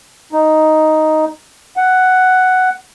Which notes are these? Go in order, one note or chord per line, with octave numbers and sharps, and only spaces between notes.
D#4
F#5